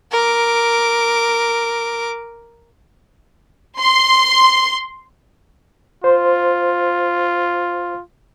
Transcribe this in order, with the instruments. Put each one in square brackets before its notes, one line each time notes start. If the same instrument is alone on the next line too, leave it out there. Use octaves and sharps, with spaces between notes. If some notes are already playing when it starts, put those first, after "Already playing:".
[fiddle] A#4 D6
[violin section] C6
[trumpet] F4 [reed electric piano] C5